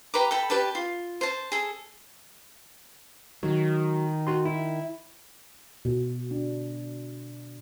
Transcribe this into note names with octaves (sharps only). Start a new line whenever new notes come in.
G4 B4 A#5 D6
A4 G5 B5
G4 B4 D5 A5
F4
C5 A5
G#4 A4
D#3 F#3
F#4 C6
E4
B2
D4